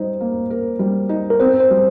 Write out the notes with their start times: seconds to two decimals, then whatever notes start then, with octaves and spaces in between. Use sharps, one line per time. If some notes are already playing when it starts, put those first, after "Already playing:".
Already playing: G3 D#4 C5
0.20 A#3
0.50 A#4
0.79 G3
1.09 D#4
1.30 A#4
1.40 C4 C5
1.60 C5
1.70 G3